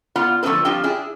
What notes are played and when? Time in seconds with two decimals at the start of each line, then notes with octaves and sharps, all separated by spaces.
0.16 B3 F4 D5 F#5
0.43 D3 F3 A3 B3 C4 B4
0.65 F3 G3 C4 D4 F4 G5
0.84 D4 E4 G#4